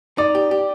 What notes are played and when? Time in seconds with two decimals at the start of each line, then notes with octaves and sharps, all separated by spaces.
0.18 D#4 D5
0.35 G4
0.51 G4